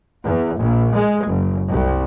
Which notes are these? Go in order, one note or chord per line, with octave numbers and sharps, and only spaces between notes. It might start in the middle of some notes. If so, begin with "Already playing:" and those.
E2
A#1
G#3
F#1
C2